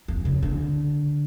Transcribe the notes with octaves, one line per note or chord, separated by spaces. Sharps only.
F2
C#3
D3